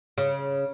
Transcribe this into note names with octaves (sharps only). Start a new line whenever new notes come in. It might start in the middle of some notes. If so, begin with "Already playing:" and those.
C#3